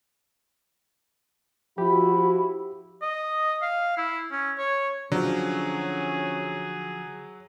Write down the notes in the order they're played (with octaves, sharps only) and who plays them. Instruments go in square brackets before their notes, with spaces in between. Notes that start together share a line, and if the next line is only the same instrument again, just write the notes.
[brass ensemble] F3 E4 F#4 [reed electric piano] G4 [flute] B5
[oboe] D#5
F5
E4
C#4
C#5
[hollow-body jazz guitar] D3 F3 [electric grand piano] F#3 [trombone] C#4 [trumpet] G#4